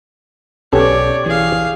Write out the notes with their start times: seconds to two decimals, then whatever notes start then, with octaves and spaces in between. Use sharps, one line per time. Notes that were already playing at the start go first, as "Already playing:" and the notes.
0.73 B1 B3 C#4 G4 A4 C#5 D5
1.26 E3 G#4 F5